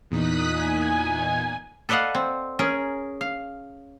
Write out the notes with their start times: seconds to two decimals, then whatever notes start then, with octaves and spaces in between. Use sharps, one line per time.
0.11 E2 A#2 D#4 D#6 F#6 B6
0.50 G#5
1.89 A4 B4 D5 D#5 F5 F#5
2.15 C4
2.59 C#4 G#4 A#4
3.21 F5